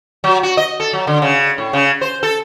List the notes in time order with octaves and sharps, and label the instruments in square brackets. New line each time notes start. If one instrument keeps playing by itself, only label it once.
[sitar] F#3
F#4
D#5
A4
F#3
D3
C#3
A2
C#3
C5
A4